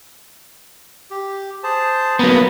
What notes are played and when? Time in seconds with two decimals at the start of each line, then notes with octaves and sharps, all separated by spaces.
1.11 G4
1.64 G#4 C5 A5
2.19 F#3 A#3 B3 A#5 B5 D#6